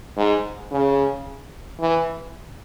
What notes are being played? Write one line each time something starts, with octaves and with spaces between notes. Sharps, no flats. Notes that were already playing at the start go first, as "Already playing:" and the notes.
G#2
C#3
E3